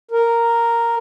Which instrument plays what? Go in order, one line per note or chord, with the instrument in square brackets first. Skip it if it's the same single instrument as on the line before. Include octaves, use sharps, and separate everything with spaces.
[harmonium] A#4